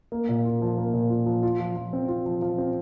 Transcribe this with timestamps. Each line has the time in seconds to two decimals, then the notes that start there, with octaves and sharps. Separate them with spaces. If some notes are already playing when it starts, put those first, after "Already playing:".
0.12 A#3
0.29 A#2
0.45 F4
0.62 F3
0.78 A#3
0.94 A#2
1.10 F4
1.26 F3
1.43 F4
1.60 F3
1.76 F3
1.93 C4
2.08 F4
2.26 F3
2.42 F3
2.58 C4